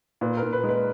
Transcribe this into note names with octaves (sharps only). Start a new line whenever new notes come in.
A#2 B4
A#4
A#2
B4
G#3
B4